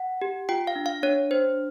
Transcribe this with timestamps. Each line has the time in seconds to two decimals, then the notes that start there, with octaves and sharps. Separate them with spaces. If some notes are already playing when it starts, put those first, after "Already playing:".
Already playing: F#5
0.22 G4
0.49 F4 G5
0.67 F5
0.75 D4
0.86 F5
1.03 D4 C#5
1.31 D4 C5